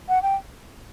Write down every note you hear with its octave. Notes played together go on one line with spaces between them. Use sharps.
F#5
G5